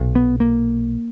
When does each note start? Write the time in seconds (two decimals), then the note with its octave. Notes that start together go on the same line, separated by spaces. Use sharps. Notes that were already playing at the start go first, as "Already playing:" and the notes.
Already playing: B1 A#2
0.15 B3
0.40 A#3